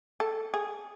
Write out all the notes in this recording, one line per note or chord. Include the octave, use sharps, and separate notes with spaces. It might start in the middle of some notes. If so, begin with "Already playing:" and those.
A4
G#4